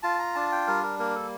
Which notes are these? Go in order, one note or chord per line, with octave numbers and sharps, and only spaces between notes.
F4 A5
A#5
D4 A5
G5
G3 A#4
A#4
A#3 A#4
A4